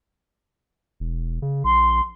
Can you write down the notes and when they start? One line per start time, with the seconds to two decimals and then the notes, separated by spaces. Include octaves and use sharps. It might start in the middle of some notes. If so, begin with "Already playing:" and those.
1.00 E1
1.42 C#3
1.64 A#1 C6